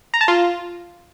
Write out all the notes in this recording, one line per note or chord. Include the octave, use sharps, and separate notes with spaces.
A#5
A5
F4